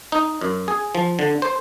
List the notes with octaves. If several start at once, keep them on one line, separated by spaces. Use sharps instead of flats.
D#4
F#2
G#4
F3
D3
C5